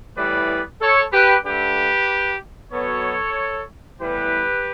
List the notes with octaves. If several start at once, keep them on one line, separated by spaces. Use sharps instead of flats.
A2 E3 G3 B3 B4 D5
A4 C#5
G4 B4
D3 A3 G4 B4
B2 F#3 B3 A4 C#5
A2 E3 G3 B3 G4 B4